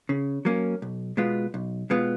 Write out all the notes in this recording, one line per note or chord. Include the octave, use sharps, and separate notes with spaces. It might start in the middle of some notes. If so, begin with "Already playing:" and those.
C#3
F#3 A#3 C#4
B1
B2 G#3 B3 F4
B1
B2 G#3 B3 F4